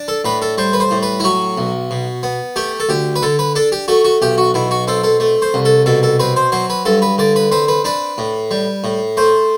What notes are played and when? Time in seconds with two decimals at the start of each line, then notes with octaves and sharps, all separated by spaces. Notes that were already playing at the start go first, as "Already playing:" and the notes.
Already playing: D4
0.08 A4
0.25 A2 B4
0.42 A4
0.58 G3 C5
0.73 B4
0.80 C5
0.91 A2
1.03 B4
1.20 E4
1.24 F#3 F#4
1.58 B1
1.91 B2
2.23 B3
2.56 A3 G4
2.80 A4
2.89 D2 G4
3.16 B4
3.22 D3 A4
3.39 B4
3.55 D4 A4
3.72 G4
3.88 A3 F#4
4.05 F#4
4.22 B1 G4
4.38 F#4
4.54 B2 E4
4.71 F#4
4.88 C4 A4
5.04 A4
5.20 A3
5.42 C5
5.54 C2
5.65 A4
5.86 B2 A4
6.03 A4
6.20 C4 B4
6.36 C5
6.52 F#3 C5
6.70 B4
6.85 G2 A4
7.02 B4
7.18 D3 D5
7.36 B4
7.52 C4 B4
7.68 B4
7.84 D4 B4
8.18 A2
8.51 G3
8.84 A2
9.17 A3 C5